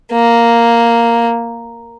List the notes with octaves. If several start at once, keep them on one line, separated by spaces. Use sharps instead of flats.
A#3